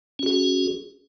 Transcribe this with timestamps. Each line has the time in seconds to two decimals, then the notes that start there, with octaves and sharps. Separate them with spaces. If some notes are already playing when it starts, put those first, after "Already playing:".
0.19 C#4
0.23 F#4
0.26 G#4